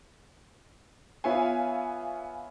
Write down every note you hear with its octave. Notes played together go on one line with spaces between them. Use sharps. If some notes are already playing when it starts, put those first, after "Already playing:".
B3 F4 C#5 E5 F5 G#5